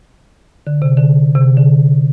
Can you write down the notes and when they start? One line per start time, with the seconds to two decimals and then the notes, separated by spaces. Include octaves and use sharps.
0.67 D3
0.82 C3
0.97 D3
1.35 C3
1.57 D3